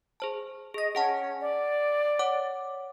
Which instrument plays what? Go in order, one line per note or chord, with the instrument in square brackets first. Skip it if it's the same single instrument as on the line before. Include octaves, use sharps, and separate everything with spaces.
[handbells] G#4 C5 A5
[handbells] G#4 A#6 [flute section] D#5
[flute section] C#4 [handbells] G#4 F#5 A5
[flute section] D5
[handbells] C#5 F#5 D6